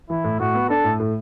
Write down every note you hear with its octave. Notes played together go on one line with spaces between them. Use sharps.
E3 E4
A2
A2 F#4
B3
D4 A4
A2
A2